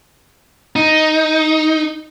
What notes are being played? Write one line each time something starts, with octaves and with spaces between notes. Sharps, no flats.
D#4